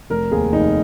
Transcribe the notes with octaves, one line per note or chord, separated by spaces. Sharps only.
F1 A#4
D#2 G#4
F1 D#4